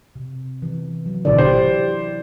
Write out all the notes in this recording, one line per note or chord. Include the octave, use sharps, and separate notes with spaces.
C3
E3
F#3
G#1 B2 D3 E4 D5
G4 C5